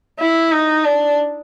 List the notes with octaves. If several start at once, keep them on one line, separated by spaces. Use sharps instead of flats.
E4
D#4
D4